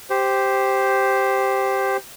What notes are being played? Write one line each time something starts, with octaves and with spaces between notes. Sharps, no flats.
G4 C5